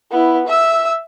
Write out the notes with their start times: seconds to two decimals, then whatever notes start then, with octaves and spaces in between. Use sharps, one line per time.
0.11 B3 E4
0.47 E5 E6